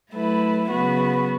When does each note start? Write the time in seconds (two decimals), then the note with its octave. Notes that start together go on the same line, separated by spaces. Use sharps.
0.11 F#3 A3 E4 B4
0.70 C#3 F#3 B3 F#4 B4